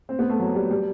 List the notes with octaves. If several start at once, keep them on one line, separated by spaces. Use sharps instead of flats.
C4
B3
A3
F#3
G3
G3